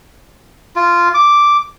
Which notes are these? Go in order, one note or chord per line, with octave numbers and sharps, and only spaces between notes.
F4
D6